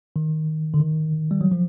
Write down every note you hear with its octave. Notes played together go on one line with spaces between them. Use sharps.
D#3
D3
D#3
G3
F#3
F3